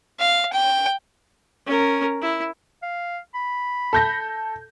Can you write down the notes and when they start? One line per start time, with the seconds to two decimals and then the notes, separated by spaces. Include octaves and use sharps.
0.19 F5
0.53 G5
1.67 C#4 A#4
2.22 E4
2.82 F5
3.34 B5
3.93 A4 G6 A#6